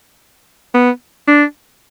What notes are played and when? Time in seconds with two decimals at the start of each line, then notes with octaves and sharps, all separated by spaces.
0.74 B3
1.28 D4